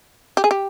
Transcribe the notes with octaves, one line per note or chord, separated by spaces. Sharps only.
G4
G#4
G4